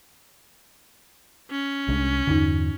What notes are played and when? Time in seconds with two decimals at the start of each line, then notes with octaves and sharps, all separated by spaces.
1.51 C#4
1.88 C2 G#3 D4
2.27 E2 G2 D3 D#4